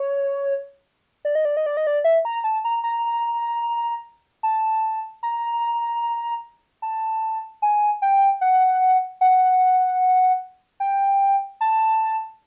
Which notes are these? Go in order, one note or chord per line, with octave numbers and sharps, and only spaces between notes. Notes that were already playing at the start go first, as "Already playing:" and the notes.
Already playing: C#5
D5
D#5
D5
D#5
D5
D#5
D5
E5
A#5
A5
A#5
A#5
A5
A#5
A5
G#5
G5
F#5
F#5
G5
A5